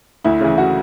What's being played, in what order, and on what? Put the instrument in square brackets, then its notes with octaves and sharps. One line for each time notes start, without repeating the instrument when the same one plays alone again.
[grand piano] D2 [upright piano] E4
[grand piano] C#3 E3
[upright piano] F#4